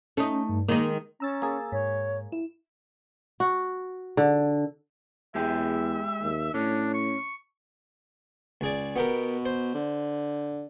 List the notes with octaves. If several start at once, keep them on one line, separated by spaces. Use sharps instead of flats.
A3 C#4 D#4
G2
D#3 G#3 A#3 D#4
C#4 A#5 E6 A6
A#3 G#4
G#2 C#5
E4
F#4
D3
E2 G#3 G4 G#4 E5
D#2
A2 C#4 D4
C#6
C#2 G#4 D5
B2 B3 G4 A#4
C5
D3